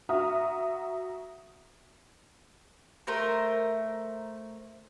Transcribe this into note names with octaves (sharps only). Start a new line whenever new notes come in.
F#4 E5 A#5 D#6 F6
A3 A#4 C5